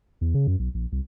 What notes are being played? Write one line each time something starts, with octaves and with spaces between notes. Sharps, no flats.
E2
C#3
F#2
B1
A#1
C2